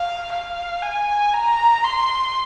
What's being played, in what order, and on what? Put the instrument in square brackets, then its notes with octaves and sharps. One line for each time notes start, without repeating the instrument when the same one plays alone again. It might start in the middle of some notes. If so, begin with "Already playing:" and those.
Already playing: [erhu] F5
F5
G#5
A#5
C6